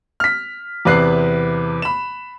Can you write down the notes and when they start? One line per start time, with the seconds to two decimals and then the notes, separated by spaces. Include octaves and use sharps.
0.20 F6 B6
0.85 E2 C3 B4 F#6 C7
1.82 B5 E7